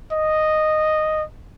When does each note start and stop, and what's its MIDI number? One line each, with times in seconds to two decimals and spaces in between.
0.13 1.23 75